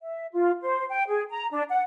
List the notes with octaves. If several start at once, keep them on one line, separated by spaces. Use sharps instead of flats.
E5
F4
C5
G5
G#4
A#5
D4
F#5